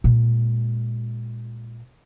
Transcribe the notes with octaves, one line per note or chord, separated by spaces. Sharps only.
A#2 G#3